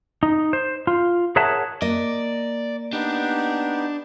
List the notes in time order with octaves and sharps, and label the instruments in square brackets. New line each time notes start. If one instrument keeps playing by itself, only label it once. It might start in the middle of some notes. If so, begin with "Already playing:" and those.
[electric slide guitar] D#4
C5
F4
G#4 A#4 C#5 E5 F#5 A5
[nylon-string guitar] A#3 D#5 [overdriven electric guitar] D5
[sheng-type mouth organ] B3 D#4 G4 [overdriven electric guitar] D4